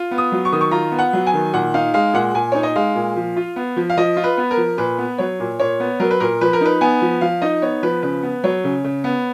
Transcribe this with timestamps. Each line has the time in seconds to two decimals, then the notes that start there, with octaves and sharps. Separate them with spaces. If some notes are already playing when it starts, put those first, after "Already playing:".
Already playing: F4
0.11 B3
0.18 D#6
0.32 F#3
0.45 C#6
0.52 D#3 D#6
0.61 C#6
0.71 F4 A#5
0.92 B3
0.99 F#5
1.13 F#3
1.27 G#5
1.34 D#3
1.53 A#2 F#5
1.74 D#4 F5
1.94 G#3 F5
2.14 A#2 F#5
2.34 A#2 G#5
2.52 D#4 C#5
2.63 D#5
2.76 G#3 F5
2.95 A#2
3.16 F3
3.36 F4
3.56 B3
3.77 F3
3.90 F5
3.97 F3 D#5
4.17 F4
4.24 B4
4.38 B3
4.51 A#4
4.57 F3
4.78 A#2 B4
4.98 B3
5.18 F#3 C#5
5.40 A#2
5.60 A#2 C#5
5.80 B3
6.00 F#3 A#4
6.11 B4
6.20 A#2 A#4
6.41 F3 B4
6.53 A#4
6.61 D#4 B4
6.81 B3 G#5
7.02 F3
7.21 F3 F5
7.42 D#4 D#5
7.62 B3 C#5
7.83 F3 B4
8.03 C#3 B4
8.23 B3
8.44 F#3 C#5
8.64 C#3
8.84 C#3
9.04 B3